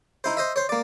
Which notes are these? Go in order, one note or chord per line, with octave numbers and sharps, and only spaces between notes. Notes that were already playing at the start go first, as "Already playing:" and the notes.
D#4 E4 C5
C5 D#5 E5
C5 C#5
A#3 D5